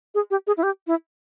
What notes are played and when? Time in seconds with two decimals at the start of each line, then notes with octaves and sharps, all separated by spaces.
0.15 G#4
0.31 G4
0.47 G#4
0.57 E4
0.63 G4
0.87 E4